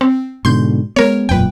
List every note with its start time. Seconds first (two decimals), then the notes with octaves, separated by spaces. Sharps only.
0.01 C4
0.45 G#2 B2 D3 C6 G6
0.96 G#3 B3 A#4 C#5
1.29 E1 F#2 A#2 B4 G5